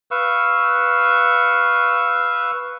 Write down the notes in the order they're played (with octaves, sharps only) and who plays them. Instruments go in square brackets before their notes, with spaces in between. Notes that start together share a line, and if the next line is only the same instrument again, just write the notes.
[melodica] B4 F5 C#6 E6